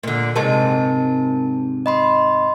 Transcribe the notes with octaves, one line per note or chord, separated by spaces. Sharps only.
A#2 D3
G#2 C3 G#3 A#4 A5
D#5 B5 C6